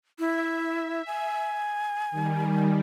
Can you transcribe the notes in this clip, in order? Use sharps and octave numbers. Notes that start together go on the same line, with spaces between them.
E4 E5
G#5
D#3 G3